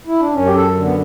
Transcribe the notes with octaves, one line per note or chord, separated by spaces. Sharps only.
E4
D4
F#2 C#4
G4
A4
D3
B3